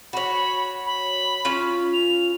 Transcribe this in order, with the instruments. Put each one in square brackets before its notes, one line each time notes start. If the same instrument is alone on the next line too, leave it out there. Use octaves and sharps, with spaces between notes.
[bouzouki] F#4 C#5 [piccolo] B5
[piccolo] B5
[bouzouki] C#4 F4 F5
[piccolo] F7